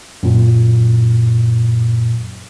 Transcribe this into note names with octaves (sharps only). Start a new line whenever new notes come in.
F#2 A#2